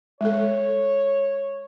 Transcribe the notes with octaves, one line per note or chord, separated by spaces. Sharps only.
G#3 A4 C#5